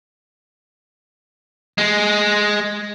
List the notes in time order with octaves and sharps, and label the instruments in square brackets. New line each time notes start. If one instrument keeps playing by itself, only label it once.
[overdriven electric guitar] G#3